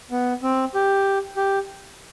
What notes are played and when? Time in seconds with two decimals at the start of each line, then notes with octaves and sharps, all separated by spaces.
0.11 B3
0.43 C4
0.74 G4
1.37 G4